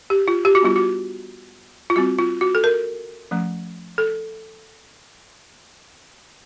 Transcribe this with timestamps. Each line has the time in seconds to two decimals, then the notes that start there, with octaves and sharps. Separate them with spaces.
0.10 G4
0.28 F4
0.45 G4
0.55 F#4
0.61 G3 B3 D4 F4
0.76 F#4
1.90 F4
1.96 G3 C4 F#4
2.19 F4
2.41 F#4
2.55 A4
2.64 A#4
3.31 F3 A3 C#4
3.98 A4